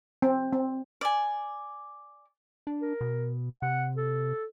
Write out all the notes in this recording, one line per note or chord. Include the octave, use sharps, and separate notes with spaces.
C4
C4
D5 G#5
D4
A#4
B2
C3 F#5
A4